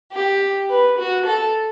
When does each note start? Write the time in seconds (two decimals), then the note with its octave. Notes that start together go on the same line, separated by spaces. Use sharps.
0.13 G4
0.69 B4
0.98 F#4
1.26 A4